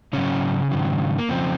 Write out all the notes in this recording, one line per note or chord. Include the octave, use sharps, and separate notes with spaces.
G#2 C#3 F#3 C#4
G#2 D#3 F#3
A#3
F2 C#3 F3 C4